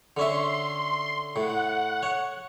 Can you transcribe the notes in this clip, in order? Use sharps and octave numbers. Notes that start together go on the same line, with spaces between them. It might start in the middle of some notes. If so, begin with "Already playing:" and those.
D3 C#4 E5 C6
A2 F#5
C#5